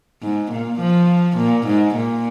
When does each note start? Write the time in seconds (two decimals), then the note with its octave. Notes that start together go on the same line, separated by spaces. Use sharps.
0.22 G#2
0.51 A#2
0.80 F3
1.37 A#2
1.67 G#2
1.95 A#2